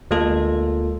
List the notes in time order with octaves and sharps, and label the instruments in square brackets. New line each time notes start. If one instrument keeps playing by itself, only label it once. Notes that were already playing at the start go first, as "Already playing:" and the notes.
[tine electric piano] D2 G#3 A#3 F4 A4